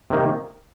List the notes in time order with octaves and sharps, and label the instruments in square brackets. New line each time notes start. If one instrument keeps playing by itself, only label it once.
[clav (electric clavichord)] C3 D#3 A#3